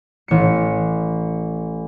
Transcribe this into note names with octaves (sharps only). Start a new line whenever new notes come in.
A1 C#7